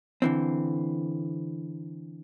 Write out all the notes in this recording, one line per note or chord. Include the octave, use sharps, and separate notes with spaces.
D3 E3 C4